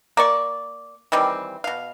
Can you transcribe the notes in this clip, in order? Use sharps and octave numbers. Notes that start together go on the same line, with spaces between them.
A#3 D5 C#6
D#3 E3 G3 C4
B2 F5